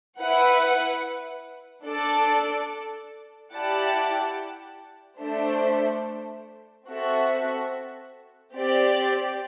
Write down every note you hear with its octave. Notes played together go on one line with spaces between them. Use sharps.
E4 B4 F#5
D4 A4 D5 A5
E4 G4 D5 F#5 A5
A3 D4 A4 C5 E5
C4 F#4 A4 E5
C4 G4 D5